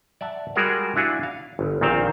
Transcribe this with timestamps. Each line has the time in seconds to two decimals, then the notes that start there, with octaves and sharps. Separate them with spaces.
0.21 D5 E5 F#5 A5
0.55 G3 G#3 F#4 G#4 A#4 F#5
0.96 D4 E4 F#4 F5 F#5 G#5
1.23 F5
1.59 G1
1.81 A#1 A#2 D#3 C4 C5 F5